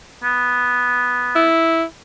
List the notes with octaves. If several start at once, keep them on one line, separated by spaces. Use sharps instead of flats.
B3
E4